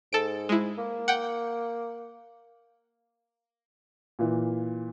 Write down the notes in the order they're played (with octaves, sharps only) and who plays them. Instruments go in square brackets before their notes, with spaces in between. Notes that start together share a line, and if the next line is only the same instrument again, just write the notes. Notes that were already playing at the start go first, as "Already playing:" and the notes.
[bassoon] G#2 [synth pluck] A4 D7
[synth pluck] G#3 E4
[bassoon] A#3
[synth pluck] F#5 G5
[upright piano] A#2 E3